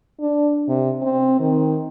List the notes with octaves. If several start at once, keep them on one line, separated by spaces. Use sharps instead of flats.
D4
C3
C4
D#3